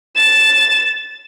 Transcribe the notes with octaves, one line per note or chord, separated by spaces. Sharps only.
A6 E7